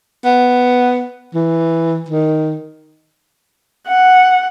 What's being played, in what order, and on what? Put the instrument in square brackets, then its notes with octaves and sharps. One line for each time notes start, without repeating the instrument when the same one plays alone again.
[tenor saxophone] B3
E3
D#3
[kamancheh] F#5